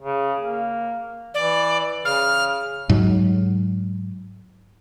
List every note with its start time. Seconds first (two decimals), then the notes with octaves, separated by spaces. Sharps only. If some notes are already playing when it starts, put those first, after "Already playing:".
0.02 C#3
0.40 A#3
1.34 E3 D5
2.05 C#3 F6
2.90 G#2 F#3